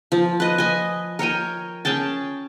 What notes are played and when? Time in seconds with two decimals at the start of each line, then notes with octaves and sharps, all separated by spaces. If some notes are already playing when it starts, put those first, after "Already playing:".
0.12 F3
0.40 B4 D#5
0.58 D#5 G#5
1.19 A#4 C#5 G5 G#5
1.85 C#4 G#4 G5 A5